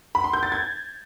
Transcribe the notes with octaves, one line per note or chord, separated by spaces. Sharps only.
B5
C6
G6
A6
G#6